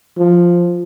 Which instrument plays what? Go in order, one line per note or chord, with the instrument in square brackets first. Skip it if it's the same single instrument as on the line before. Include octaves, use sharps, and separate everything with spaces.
[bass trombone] F3